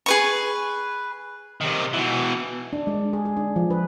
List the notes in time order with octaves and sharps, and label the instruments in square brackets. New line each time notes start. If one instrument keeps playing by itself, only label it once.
[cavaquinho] G#4 B4 C#6
[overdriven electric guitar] C3 D#3
B2 E3
[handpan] D4
G#3
G#4
G#4
D4
F3
B4